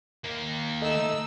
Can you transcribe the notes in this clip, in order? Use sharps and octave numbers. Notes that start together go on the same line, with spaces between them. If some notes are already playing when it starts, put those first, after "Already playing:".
D#3 A#3
A3 D#4 A4 D#5 E6